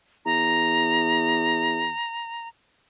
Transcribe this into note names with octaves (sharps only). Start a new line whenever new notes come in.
E2 A#5